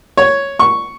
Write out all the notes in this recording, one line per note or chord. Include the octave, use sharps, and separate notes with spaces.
C#5
C#6